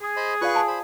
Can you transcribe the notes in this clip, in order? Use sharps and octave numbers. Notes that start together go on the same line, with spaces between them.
G#4
C5 D#5 B5
F4 B4 D5 F5 C#6 F#6
F5 G#5 A5
C5 B5